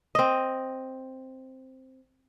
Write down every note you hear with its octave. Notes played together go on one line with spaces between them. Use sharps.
C4 D#5